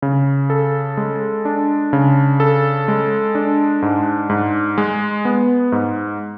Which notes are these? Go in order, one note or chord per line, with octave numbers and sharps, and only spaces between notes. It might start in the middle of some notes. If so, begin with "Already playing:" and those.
C#3
A4
G#3
D4
C#3
A4
G#3
D4
G#2
G#2
G#3
B3
G#2